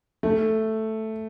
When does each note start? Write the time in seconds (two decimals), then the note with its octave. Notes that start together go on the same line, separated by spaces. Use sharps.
0.23 A3